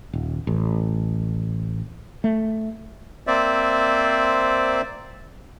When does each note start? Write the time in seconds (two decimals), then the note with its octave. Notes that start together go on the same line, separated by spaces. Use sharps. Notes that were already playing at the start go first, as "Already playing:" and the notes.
0.13 D#1
0.47 A1
2.24 A3
3.27 A#3 C4 C5 D5 E5